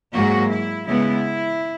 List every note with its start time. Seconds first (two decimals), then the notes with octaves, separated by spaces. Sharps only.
0.14 G#2 F#3 A#3 F#4
0.51 E4
0.88 C#3 G#3 B3 E4